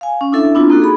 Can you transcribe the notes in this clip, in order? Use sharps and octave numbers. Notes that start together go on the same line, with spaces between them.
F5 G#5
C#4
D4 E4 A4 E5
B3 C4 D4 E4 F4
A#3 D#4 F#4 A4
G#4 B5